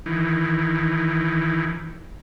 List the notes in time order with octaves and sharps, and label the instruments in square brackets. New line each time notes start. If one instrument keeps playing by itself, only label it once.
[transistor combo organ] D#3 E3